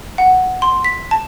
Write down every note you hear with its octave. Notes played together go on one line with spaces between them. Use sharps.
F#5
C6
B6
A5